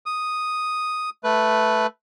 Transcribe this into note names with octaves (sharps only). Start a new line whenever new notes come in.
D#6
A3 B4